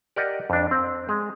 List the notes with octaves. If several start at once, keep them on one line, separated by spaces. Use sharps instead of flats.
G4 A#4 D5 D#5 F#5
F2 D4
C4
G#3